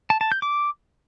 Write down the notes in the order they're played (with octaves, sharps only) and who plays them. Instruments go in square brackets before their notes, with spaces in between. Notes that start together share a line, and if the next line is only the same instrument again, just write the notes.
[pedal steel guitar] A5
A5
G6
D6